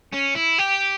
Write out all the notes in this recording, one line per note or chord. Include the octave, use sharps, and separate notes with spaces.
C#4
E4
G4